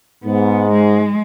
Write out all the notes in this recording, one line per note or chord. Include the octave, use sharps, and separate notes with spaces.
G#2 B3
G#3